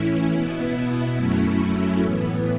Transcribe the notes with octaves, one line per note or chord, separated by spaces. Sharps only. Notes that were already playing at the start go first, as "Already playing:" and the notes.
Already playing: A2 E3 C#4 E4
B2 B3 E4
F#2 F#3 A3 C#4 E4
A2 E3 B3